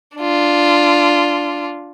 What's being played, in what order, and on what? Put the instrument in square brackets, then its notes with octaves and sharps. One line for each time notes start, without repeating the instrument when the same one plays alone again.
[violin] D4 F4